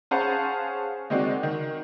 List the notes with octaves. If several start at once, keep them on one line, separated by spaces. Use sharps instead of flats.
C#4 G#4 C5 F5 F#5 A5
D#3 G#3 C4 F#4 D5
D#3